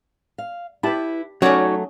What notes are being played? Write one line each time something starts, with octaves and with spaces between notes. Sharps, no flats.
F5
E4 G4 B4 A5 B5
F#3 A3 C#4 D#4 F#4 C#5 D5 D6